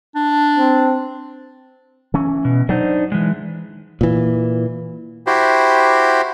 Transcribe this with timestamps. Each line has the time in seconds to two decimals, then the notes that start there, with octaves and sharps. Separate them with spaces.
0.15 D4
0.58 C4
2.14 E3 C#4
2.45 B2
2.69 F#3 D4 D#4 C5
3.12 E3 G#3
4.01 A#2 E3
5.27 E4 F#4 G4 C5